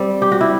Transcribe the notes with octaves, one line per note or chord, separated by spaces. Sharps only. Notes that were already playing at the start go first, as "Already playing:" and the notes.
Already playing: G3 C4
G4
F#4
G3 E4